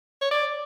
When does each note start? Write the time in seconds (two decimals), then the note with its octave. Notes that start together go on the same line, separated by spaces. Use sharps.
0.22 C#5
0.31 D5